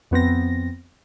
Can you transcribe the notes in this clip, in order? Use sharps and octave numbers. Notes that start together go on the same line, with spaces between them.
F2 B3 C4 A#6